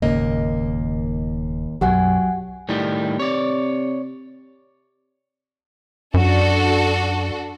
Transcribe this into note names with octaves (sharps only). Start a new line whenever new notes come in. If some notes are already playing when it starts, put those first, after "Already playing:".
D#1 D#2 G#2 C#3 A#3 D#5
B1 F#2 F#3 G4 F#5 G#5
A2 D#3 G3
C3 C#5 D5
F#2 D4 F#4 A4